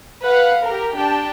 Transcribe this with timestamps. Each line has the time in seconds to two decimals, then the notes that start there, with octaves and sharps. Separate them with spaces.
0.22 B4 F5 F#5
0.64 G4 A#4
0.95 D4 G4 G5 A5